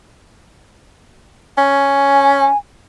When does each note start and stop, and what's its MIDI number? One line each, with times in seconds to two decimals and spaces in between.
1.58 2.47 61
1.58 2.57 80